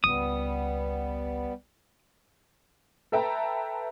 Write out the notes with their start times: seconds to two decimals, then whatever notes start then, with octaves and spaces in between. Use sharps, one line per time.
0.04 G#1 C#2 G3 B3 D#6
3.12 A4 B4 E5 G5 A5 A#5